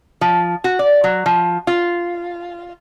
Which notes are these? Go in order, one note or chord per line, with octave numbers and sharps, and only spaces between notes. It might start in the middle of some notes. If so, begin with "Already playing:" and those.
F3
F#4
D5
F#3
F3
F4